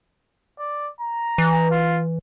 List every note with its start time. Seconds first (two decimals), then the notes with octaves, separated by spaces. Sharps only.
0.59 D5
1.00 A#5
1.38 E3
1.71 F4